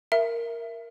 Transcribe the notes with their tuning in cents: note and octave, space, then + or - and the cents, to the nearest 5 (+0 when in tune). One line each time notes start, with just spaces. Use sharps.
A#4 +0 E5 +15